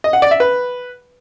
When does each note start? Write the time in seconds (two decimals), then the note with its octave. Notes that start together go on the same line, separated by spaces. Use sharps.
0.04 D#5
0.13 F#5
0.22 D5
0.31 E5
0.40 B4